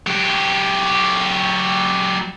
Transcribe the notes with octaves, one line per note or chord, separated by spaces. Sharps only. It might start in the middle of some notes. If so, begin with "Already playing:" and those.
F#3 G4